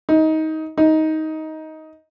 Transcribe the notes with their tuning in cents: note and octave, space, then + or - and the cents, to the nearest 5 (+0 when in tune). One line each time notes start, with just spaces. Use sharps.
D#4 +20
D#4 +15